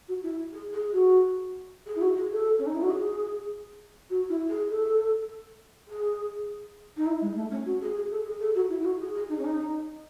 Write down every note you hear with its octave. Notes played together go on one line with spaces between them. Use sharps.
F#4
E4
G#4
G#4
F#4
G#4
E4
F#4
G#4
A4
C#4
D#4
E4
F#4
G#4
F#4
E4
G#4
A4
G#4
D#4
E4
G#3
A3
C#4
F#4
G#4
G#4
A4
G#4
A4
F#4
E4
E4
F#4
G#4
G#4
D#4
C#4
D#4